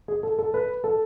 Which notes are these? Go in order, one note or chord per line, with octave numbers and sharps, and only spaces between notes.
G#4
A4
A4
B4
A4